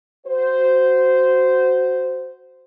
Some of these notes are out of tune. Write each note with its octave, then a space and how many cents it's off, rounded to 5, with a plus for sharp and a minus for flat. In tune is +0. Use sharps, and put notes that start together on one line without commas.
F#4 +0 C5 -10